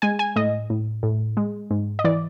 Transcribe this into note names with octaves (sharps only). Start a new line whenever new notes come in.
G#3 G#5
G#5
A2 D#5
A2
A2
G#3
G#2
D#5
E3 D5